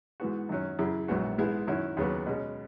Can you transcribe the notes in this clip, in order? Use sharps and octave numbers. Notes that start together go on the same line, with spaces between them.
G#2 E3 B3 F#4
F#2 D#3 F#3 C#4
F#2 C#3 E3
A#1 G#2 F#3 B3 F#4
G#2 E3 G#3 B3 E4
F#2 D#3 F#3 C#4 E4
D#2 C#3 F#3 B3 F#4
B2 G#3 C#4